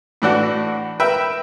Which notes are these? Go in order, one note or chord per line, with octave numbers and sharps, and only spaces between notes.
A2 E3 D4 F#4
A#4 B4 E5 G5